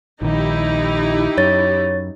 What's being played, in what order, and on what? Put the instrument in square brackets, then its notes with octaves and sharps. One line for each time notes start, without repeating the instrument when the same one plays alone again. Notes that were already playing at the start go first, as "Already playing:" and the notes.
[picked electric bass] A#1 D#3 [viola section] D#4 E4 G4
[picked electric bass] F#2 [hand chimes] C#5 A6